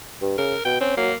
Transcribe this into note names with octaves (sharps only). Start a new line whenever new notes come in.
G2
C#3 A#4
B2 G5
C4 C#4
F#3 A#3